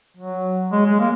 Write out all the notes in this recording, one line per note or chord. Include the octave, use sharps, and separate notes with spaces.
F#3
G#3
G#3
A#3